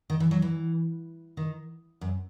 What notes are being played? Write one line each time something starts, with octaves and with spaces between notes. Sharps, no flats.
D#3
E3
F#3
E3
D#3
F#2